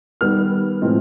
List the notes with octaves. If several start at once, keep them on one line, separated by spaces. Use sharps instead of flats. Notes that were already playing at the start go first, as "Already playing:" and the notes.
D#3 G3 B3 F6
A2 F3 G#3 C4